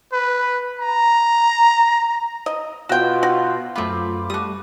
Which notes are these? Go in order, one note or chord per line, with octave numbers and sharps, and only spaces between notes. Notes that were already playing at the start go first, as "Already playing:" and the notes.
B4
A#5
D#5
B2 F4 F#4 G5
F#4
F#2 A3 C4 F4 B4 D6
G3 A3 F#4 D#6